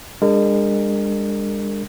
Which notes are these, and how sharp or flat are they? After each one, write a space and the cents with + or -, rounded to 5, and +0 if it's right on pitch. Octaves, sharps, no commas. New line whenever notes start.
G#3 -35 D4 +0 A#4 -35